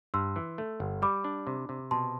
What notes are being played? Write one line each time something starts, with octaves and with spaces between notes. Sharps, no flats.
G2 C6 E6
E3
A3
G1
G3 B5 D6
D4
C3
C3
B2 A5 C6